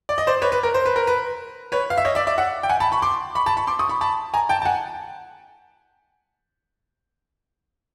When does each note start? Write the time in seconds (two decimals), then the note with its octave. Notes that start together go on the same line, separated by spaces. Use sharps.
0.09 D5
0.18 D#5
0.27 C5 D5
0.42 B4 C#5
0.52 B4
0.63 A#4
0.74 C5
0.86 B4
0.96 A#4
1.07 B4
1.72 B4 C#5
1.90 F5
1.98 E5
2.05 C#5 D#5
2.15 D5 E5
2.27 D5 E5
2.38 E5 F#5
2.63 G5
2.69 F#5 G#5
2.80 A5 B5
2.92 B5 C#6
3.02 C6 D6
3.35 B5 C#6
3.46 A5 B5
3.57 B5 C#6
3.67 C6 D6
3.79 C#6 D#6
3.89 B5 C#6
4.01 A5 B5
4.34 G#5 A#5
4.49 G5 A5
4.62 A5
4.65 F#5 G#5